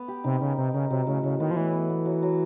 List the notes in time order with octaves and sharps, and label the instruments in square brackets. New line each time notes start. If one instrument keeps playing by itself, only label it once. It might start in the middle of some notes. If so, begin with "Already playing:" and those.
Already playing: [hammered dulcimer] B3
G4
[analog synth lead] C3 [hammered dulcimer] D#4
[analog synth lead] C#3 [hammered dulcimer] A#4
[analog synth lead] C3 [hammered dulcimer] D#4
[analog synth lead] C#3 [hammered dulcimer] A#4
[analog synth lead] C3 [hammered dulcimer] F#3
[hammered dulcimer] A2 [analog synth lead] C#3
[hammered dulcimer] A2 [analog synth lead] C#3
[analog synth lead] D#3 [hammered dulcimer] B3
[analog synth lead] F3
[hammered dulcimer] A2 [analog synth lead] E3
[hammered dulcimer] B3
B3
F#3
F#3